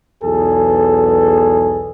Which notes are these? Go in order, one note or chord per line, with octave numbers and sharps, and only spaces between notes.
B1 E2 G#4 A4